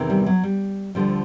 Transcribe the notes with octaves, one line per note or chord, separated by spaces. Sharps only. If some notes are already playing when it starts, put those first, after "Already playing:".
Already playing: E2 C3 D#3
G3
F#3
G3
D2 D3 F3 G3